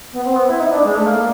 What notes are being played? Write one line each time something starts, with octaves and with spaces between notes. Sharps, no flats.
B3
C4
B3
E4
D#4
D4
G#3
A3
A#3